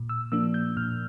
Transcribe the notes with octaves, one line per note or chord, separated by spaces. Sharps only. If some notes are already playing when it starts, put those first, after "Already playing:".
Already playing: A#2
E6
F3 A#3 D4 E6
G6
A#2 F6